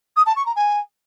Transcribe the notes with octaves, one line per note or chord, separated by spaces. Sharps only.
D#6
A5
C#6
A#5
G#5